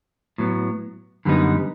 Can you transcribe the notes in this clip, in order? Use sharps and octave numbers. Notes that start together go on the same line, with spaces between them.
A2 F#3 B3
F#2 D3 G3 B3 D#4